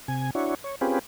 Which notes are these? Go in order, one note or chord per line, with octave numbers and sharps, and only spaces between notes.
C3 G#5
D4 E4 F#4 C#5
C#5
C4 C#4 F4 G4 G#4 B4